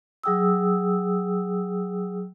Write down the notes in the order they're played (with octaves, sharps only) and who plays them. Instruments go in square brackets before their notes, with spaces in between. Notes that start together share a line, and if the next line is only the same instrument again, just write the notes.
[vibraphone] F#3 G#4 G5 D#6 E6